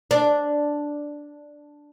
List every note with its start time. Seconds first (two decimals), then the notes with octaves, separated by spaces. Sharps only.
0.11 D4